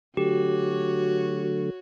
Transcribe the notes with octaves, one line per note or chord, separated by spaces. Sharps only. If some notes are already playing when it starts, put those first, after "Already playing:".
D3 F#3 A3 F#4 G4 C#5